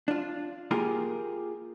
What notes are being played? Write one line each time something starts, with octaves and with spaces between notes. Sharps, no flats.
D4 F4
A#3 F4 G4 G#4 A#4